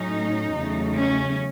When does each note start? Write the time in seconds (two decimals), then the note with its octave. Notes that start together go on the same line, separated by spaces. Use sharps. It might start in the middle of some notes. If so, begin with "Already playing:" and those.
Already playing: A2 F#3 A3 C#4 D#4
0.54 E2 C#3 F#3 A3
0.95 C#4